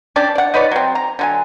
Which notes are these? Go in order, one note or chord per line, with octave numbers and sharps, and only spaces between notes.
C#4 D4 G4 D5
D5 F#5
D#4 B4 C#5 D5
F#3 C4
A#5
D3 F#3 G#5